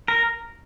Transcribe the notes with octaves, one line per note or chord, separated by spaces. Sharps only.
A#4